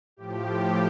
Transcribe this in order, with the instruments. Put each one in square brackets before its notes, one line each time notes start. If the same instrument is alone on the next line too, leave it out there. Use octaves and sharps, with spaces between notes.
[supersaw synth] A2 F3 G4